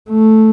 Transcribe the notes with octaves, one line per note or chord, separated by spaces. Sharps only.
A3